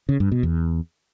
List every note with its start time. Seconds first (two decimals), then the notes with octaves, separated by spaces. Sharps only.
0.09 C#3
0.20 G2
0.32 B2
0.43 E2